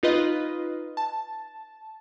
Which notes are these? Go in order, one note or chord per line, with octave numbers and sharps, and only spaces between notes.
D#4 F4 B4 D#5
A5